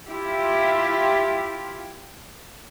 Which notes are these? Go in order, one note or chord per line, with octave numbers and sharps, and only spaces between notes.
E4 F4 G4